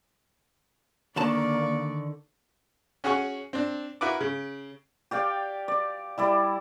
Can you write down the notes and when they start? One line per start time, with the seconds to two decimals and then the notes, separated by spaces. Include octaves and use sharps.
1.16 D3 D#3 A#3 D5 A5 C#6
3.04 C#4 F#4 G#4 F#5 C#6
3.53 C4 D4
4.01 E4 F#4 A#4 B4 D6
4.20 C#3
5.11 G4 D5 F5 G5
5.68 D5
6.18 G3 E4 D5